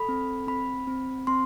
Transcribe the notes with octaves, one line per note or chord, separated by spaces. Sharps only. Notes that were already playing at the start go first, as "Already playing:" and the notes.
Already playing: A4 B5
C4
C4 B5
C4
C4 C6